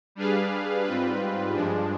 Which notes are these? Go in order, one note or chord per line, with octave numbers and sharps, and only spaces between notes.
G3 D4 G#4 B4 F5
G#2 G3 C4 F4 B4
G2 F3 G#3 D4